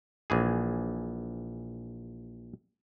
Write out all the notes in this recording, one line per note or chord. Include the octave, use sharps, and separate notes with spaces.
A#1 E3 G#4